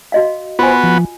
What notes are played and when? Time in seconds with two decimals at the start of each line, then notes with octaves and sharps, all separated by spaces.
0.12 F#4 D#5 F5
0.59 B3 F4 F#4 C5 G#5
0.84 F3